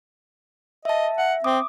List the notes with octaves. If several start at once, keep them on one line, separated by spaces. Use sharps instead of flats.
D#5 E5 A5
E5 F#5
C4 D6 D#6